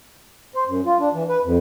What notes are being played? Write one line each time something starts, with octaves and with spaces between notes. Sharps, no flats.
C5
F#2
F4
D4
E3
B4
F2